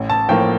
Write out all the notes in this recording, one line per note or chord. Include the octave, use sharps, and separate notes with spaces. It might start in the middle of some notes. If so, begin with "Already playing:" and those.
Already playing: A1
A5
A2 F3 A#3 G5